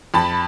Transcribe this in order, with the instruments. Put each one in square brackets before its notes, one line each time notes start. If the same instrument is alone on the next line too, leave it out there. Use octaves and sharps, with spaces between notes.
[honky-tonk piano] F2 A5 B5